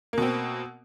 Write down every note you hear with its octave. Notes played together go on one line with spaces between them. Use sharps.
B2 A#3 C4